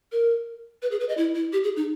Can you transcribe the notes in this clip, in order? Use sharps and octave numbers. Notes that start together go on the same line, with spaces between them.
A#4
B4
G#4
B4
D#5
E4
E4
G4
G#4
D#4